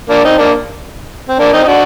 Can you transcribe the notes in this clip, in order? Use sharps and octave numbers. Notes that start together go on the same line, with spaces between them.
A#3 D4
C4 D#4
A#3 D4
C4
A#3 D4
C4 D#4
D#4
D4 F#4